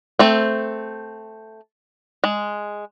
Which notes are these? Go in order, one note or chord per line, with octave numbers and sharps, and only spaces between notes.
A3 C4
G#3